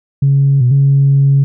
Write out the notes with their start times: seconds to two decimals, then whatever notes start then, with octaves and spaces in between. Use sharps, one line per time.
0.22 C#3
0.61 B2
0.71 C#3